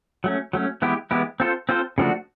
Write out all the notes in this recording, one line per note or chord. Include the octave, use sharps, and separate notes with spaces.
F#3 A3 C#4
F#3 A3 C#4
E3 G#3 B3 E4 G4
E3 G#3 B3 E4 G4
C4 F4 A4 C5
C4 F4 A4 C5
C#3 F3 A3 D4 F#4